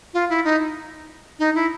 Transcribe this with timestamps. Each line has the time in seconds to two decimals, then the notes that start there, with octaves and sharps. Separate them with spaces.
0.14 F4
0.30 E4
0.44 D#4
1.39 D#4
1.55 E4